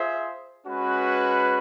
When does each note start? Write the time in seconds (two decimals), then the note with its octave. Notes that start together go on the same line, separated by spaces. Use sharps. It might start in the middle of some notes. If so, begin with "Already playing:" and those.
Already playing: F4 G#4 C5 E5
0.65 G#3 C#4 F#4 B4